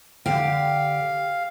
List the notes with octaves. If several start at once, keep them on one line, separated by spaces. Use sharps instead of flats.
D3 G4 F5